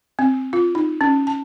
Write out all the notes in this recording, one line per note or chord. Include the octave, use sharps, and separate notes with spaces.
C4
F4
D#4
C#4
A5